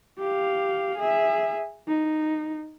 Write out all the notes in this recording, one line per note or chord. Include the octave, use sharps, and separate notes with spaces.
G4 F5
G#4 E5
D#4